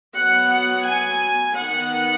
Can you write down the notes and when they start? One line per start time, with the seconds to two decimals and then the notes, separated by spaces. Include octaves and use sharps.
0.15 F#3 B3 F#5
0.51 F#5
0.85 G#5
1.55 D#3 B3 F#5